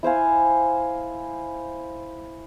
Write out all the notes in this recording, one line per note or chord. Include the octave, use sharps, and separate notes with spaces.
E4 C5 F5 G#5